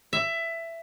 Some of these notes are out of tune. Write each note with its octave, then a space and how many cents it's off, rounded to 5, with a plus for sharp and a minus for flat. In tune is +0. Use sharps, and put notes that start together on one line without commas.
E5 +15